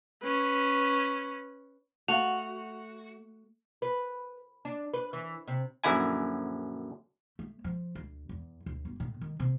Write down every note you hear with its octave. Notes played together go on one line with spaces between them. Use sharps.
C#4 B4
A3 F#4 F5 A5 F7
B4
D4
B4
E3
C3
A#1 F#2 D3 E4 G#5
A3
F3
D2
E2
D2
G1
A2
D#3
C3